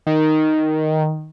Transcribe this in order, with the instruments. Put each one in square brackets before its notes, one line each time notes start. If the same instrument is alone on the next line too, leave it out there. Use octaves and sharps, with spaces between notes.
[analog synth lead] D#3